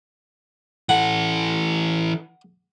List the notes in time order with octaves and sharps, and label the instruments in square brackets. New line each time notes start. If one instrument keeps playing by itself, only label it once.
[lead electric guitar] E3 A4 [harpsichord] F#5